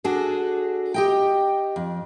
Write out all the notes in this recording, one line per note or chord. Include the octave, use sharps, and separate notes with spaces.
D4 F#4 G#4 A4
G4 D#5 G5
F2